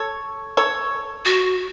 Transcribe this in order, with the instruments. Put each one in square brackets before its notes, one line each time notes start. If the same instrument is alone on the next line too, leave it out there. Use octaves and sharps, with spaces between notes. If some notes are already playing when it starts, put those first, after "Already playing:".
Already playing: [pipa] A4 C#5
A4 C#5
[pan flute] F#4